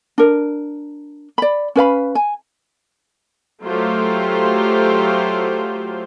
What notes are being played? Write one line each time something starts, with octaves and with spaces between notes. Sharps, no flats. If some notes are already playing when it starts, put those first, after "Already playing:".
D4 A#4
D5 B5
C#4 B4 F5 B5
G#5
F#3 A3 F4 G4 C5